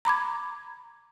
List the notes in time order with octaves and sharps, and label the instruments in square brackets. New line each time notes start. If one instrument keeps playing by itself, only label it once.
[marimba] A#5 B5 D6 G#6